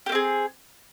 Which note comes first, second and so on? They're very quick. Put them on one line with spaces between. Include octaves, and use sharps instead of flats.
G4 A#3 C4 G#4